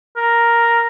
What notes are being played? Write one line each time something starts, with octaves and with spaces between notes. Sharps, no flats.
A#4